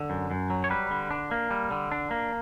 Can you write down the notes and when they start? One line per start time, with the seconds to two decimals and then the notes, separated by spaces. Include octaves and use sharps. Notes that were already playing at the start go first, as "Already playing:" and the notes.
Already playing: D3
0.10 F#2
0.31 F#2
0.50 F#3
0.64 C#5
0.70 G3 B4
0.91 D3
1.11 D4
1.31 A#3
1.51 G3
1.71 D3
1.92 D4
2.11 A#3